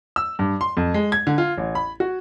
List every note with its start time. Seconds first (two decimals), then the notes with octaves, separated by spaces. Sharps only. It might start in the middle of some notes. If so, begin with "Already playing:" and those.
0.16 E6
0.39 G2
0.61 C6
0.77 F2
0.94 G#3
1.12 G#6
1.27 D3
1.38 F4
1.58 A1
1.75 B5
2.00 F#4